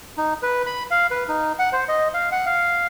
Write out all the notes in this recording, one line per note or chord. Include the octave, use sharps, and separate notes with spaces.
D#4
B4
B5
F5
B4
D#4
F#5
C5
D#5
F5
F#5
F5